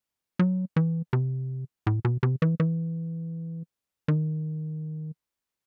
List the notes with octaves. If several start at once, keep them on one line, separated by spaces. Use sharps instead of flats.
F#3
E3
C3
A2
B2
C3
E3
E3
D#3